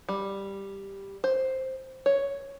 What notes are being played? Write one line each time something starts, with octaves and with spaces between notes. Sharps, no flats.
G3
C5
C#5